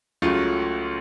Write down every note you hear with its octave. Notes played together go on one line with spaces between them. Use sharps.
C#2 C#3 F#3 A3 F4